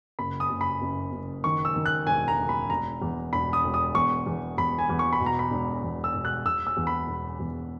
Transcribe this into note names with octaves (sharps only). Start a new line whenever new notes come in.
F#1 B5
D#6
F#1
B5
F#1
F#1
D#3 C#6
E6
D#3
F#6
E1 G#5
A#5
E1
B5
E1 A#5
E2
E1 B5
D#6
E1
D#6
E2 C#6
E2
E2 B5
G#5
E2
C#6
B5
B2
A#5
B5
E1
E2
E6
E1
F#6
E1 E6
E6
E2
B5
E1
E2